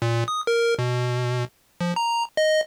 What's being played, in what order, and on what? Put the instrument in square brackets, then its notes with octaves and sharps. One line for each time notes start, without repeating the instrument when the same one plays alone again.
[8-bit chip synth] A#2
D#6
A#4
B2
F3
A#5
D#5